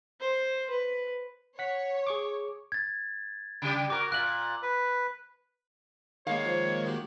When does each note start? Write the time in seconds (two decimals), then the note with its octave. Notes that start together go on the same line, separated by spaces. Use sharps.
0.20 C5
0.70 B4
1.59 C#5 F#5 B6
2.07 G#4 C#6 D6
2.72 G#6 A6
3.62 C#3 G3 G4
3.90 F#4 A#4 D6
4.12 A#2 E5 F#6 F#7
4.63 B4
6.27 D#3 G#3 A#3 C#5 F5
6.45 F3
6.86 F#4 G4